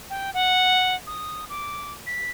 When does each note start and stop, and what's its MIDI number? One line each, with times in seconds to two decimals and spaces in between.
0.10 0.31 79
0.34 0.95 78
1.07 1.45 87
1.50 1.93 86
2.07 2.31 95